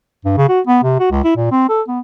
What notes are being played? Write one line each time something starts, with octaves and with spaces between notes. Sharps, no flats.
G2
C#3
F#4
B3
C3
F#4
C#2
E4
A#2
C4
A4
B3